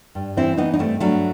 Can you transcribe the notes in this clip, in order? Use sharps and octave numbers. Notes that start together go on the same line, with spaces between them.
G2
E3 C4 E4
E3 B3 D#4
D#4
G2 A3 C4
G2 F#3 A3